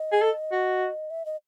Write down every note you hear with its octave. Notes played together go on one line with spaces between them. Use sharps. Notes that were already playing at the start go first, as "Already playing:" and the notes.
Already playing: D#5
G#4
A4
F#4
E5
D#5